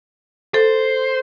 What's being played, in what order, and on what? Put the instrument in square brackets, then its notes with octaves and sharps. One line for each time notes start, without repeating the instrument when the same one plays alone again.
[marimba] A4 [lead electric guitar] C5